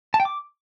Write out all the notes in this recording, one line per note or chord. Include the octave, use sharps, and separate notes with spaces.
A5
G5
D6